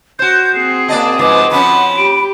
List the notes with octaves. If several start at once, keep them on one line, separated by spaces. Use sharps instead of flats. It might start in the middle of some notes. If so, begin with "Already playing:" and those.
F#4 C5 G6
C4 G#4 C7
A#3 D5 D#5 A5
G#2 F3 B4 D6
F3 C#4 F#5 B5
G4 D7